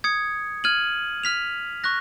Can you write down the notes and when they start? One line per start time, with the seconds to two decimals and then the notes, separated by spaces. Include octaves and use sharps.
0.04 D#6 G#6 C#7
0.64 F6 G#6 D#7 F#7
1.23 F6 B6 F7
1.84 C#6 F#6 A#6